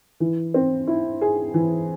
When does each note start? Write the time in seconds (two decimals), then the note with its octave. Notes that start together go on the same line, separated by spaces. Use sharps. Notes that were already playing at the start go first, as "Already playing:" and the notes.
0.20 E3
0.54 C4
0.87 E4
1.21 G#4
1.54 E3